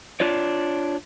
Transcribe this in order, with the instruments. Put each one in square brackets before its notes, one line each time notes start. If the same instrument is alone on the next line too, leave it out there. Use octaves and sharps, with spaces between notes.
[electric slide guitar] D4 F4 C#5 D5